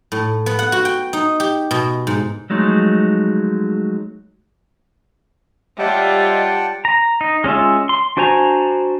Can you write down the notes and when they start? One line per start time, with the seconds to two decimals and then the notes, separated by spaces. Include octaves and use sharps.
0.12 A2
0.46 B3
0.59 F#5
0.72 F#4
0.85 G5
1.13 D#4
1.40 G4
1.71 B2
2.07 G#2
2.50 F3 F#3 G#3 A3 D#4
5.79 G3 F4 C#5 D#5 E5 F#5 G5 A5
6.85 A#5
7.21 D#4
7.44 G#3 C#4 F4 E5
7.89 C6
8.17 D4 F#4 C5 G#5 A#5